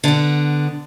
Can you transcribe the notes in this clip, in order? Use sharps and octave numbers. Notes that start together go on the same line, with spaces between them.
D3 B3